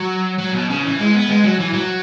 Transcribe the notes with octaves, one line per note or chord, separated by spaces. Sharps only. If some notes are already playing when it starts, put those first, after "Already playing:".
Already playing: F#3
F#3
B2
C#3
E3
G#3
B3
G#3
F#3
E3
F#3